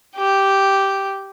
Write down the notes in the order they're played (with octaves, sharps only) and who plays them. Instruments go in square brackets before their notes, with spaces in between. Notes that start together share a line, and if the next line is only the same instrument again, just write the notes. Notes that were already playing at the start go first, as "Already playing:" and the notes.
[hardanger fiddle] G4